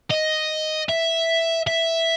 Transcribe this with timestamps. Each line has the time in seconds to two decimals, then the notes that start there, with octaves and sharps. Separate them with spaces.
0.11 D#5
0.89 E5
1.67 E5